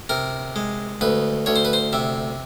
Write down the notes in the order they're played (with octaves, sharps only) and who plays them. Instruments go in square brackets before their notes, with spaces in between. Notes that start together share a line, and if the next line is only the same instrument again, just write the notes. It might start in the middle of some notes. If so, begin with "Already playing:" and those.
[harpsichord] C3 A#4
G#3
D2 B4
D2 C#5
C5
B4
C5
C3 E5